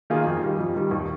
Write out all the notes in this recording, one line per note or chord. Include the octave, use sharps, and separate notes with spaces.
D#3 A#3 F4 G#4
F2
D#3 G3
F2
D#3 G3
D#2